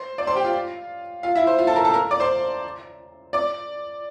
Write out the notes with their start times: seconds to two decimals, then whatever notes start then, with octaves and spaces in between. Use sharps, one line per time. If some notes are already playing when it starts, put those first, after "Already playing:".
Already playing: C5 C6
0.18 D5 D6
0.27 C5 C6
0.35 G4 G5
0.44 F4 F5
1.23 F4 F5
1.35 E4 E5
1.47 C5
1.58 F4 F5
1.67 A4 A5
1.76 A#4 A#5
1.85 A4 A5
1.94 A#4 A#5
2.11 D5 D6
2.20 C5 C6
3.33 D5 D6